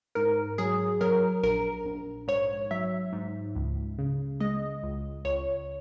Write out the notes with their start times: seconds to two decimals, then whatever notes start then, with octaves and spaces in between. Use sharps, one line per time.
0.15 G#2 A#4
0.58 F#3 G#4
1.01 F#3 A#4
1.43 A#1 A#4
1.85 A#1
2.28 G#2 C#5
2.71 F#3 E5
3.13 G#2
3.55 C#2
3.99 C#3
4.40 G#3 D#5
4.83 C#2
5.25 C#2 C#5